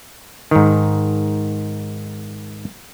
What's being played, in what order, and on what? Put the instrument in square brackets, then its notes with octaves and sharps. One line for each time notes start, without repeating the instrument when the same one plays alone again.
[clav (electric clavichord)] G#2 D#3